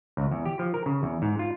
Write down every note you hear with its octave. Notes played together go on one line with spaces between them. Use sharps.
C#2
E2
G4
F3
A#4
C#3
E2
G#2
F4